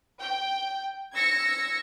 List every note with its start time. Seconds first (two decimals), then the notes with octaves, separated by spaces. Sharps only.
0.20 G5
1.14 E6 G#6 A#6 C#7